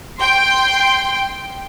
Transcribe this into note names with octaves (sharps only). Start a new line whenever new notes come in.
G5 C6